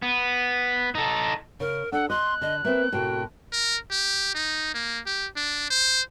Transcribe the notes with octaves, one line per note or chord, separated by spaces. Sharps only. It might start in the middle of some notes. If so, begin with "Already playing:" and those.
B3
D#4 A4
C#3 A#4
D4 A4 F#5
D#5 C6 F#6
D3 D#5
A#3 C4 B4 E5
A2 C3 A#3 F#4 G5
A#4
G4
D#4
A#3
G4
D4
C5